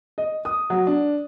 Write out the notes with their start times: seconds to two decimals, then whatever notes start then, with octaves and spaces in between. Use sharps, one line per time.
0.18 D#5
0.45 D#6
0.70 F#3
0.87 D4